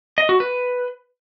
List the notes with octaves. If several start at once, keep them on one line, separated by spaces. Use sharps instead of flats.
D#5
F#4
B4